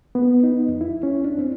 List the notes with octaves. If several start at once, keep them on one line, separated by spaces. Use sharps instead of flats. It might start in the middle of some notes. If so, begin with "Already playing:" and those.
B3
D#4
F2
E4
C#4
D4
C4